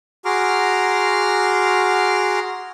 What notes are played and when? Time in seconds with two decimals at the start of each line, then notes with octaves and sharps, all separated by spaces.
0.25 F#4 G#4 A#5 C6 D6 F6